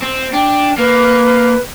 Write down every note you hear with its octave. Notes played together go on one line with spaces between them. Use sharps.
C4
D4 G5
A#3 B4